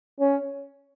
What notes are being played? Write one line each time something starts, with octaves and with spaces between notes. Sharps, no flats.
C#4